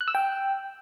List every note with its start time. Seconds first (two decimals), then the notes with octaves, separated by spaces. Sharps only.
0.01 F#6
0.08 E6
0.15 G5